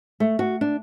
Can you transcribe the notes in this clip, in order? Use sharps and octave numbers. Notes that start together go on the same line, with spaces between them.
A3
F#4
D4